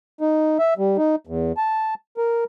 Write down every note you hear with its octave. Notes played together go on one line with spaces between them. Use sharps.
D#4
E5
G3
D#4
E2
A5
A#4